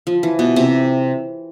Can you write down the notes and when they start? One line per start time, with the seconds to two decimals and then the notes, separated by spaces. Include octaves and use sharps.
0.07 F3
0.23 E3
0.39 B2 B3
0.56 C3 C4